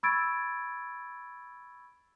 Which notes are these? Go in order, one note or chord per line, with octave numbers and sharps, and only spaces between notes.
B5 C#6 E6 G#6 A6 D7